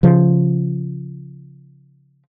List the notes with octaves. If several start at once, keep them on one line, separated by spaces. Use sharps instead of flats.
C#3 F3